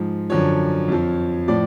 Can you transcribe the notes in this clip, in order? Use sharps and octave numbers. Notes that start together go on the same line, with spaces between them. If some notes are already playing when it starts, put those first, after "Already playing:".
Already playing: G#2 F3
F#2 D3 F3 C#5
F2 F3
A2 F3 D5